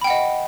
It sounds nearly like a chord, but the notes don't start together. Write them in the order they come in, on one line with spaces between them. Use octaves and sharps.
B5 G5 F#5 D#5